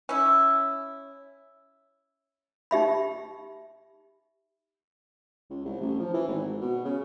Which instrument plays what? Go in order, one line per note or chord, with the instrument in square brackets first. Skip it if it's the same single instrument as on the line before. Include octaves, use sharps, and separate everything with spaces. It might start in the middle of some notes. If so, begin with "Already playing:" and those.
[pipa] C#4 E4
[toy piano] D#4 G4 E5 B5
[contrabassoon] C#2
C2
A1
F3
E3
G#1
B2
C#3